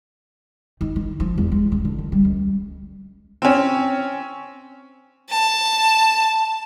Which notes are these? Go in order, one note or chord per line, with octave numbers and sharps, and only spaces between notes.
D#3
D#3
F3
E2
G#3
C#3
D3
D#3
G3
C#2
C4 C#4
A5